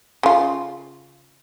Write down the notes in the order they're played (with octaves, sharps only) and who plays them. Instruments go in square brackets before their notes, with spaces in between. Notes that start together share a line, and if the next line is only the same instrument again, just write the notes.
[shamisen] C#3 F4